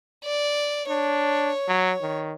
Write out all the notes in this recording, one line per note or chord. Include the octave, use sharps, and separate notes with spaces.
D5
D4 C#5
F#3
D#3